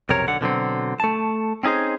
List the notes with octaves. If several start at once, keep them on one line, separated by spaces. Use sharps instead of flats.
B1 F2 C3 A#4 C#5
B1 D3 F#5
B2 D3 F#3 C4
A3 A5
C4 C#4 D#4 G#4 C5